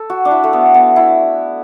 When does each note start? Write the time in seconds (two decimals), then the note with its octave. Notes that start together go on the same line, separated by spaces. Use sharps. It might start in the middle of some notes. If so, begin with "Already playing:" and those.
Already playing: A4
0.10 F#4
0.25 D4
0.31 E4
0.44 A3
0.53 B3
0.74 B3
0.96 E4